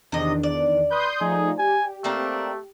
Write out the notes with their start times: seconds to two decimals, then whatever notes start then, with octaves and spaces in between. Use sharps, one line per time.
0.12 E2 C3 D#3 D4 D#5
0.43 D5
0.91 B4 C6 D#6 G6
1.21 F3 A3 D#4 G#4
1.58 G4 G#5
2.04 A3 A#3 C4 D4